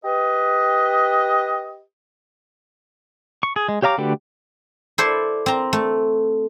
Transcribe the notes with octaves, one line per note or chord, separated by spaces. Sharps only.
G4 B4 D#5
C#6
G#4
G#3
G4 C#5 F5 A#5 D6
D3 A3 F#4 G4 B4
E4 A4 C5 D5
C4 A#5
A3